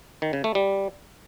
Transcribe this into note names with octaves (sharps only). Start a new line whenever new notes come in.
D#3
C#3
A3
G3